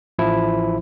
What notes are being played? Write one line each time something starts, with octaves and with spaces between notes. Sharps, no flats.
A1 F3 E4